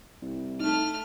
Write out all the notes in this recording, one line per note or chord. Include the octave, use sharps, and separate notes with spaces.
C2
A3 D#4 F6